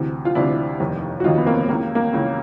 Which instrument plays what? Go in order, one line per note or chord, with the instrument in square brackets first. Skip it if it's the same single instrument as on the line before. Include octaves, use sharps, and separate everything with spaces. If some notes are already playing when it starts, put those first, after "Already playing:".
Already playing: [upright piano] D2 C3 E3
F4
D2 C3 E3 D4 E4
F1 D#2 D#3
F#4
F1 D#2 D#3 D#4 F4
B3
A#3 C4
C#2 C#3 E3 A#3
A#3
C#2 C#3 E3